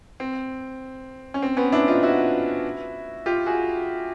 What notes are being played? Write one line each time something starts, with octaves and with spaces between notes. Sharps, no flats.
C4
C#4
C4
B3 C#4
D4 E4
D#4 F4
E4 F#4
F4 G4
F#4 G#4